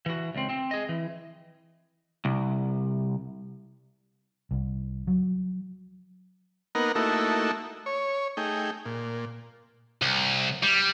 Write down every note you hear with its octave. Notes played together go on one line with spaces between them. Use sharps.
E3 F#4
C#2 C4
C4
G#4 D#5
E3
C2
C2
F#3
A#3 B3 D#4 A#4 F#5
A3 A#3 D#4 E4 F#4 A4
C#5
A3 D#4 G#4 G5
A#2
C2
G3